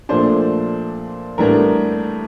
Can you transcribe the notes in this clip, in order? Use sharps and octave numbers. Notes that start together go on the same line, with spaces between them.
A#2 F3 A3 D4 C5
A2 E3 G3 B3 D4 A#4